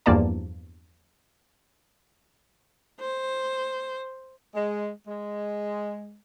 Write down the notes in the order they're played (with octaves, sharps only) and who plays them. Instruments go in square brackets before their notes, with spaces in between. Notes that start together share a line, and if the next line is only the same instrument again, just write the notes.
[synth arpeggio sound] E2 G2 F3 A#3 D5 A5
[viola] C5
[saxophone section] G#3
G#3